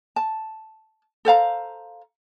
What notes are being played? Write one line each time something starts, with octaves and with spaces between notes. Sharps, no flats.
A5
A4 C5 F5 A#5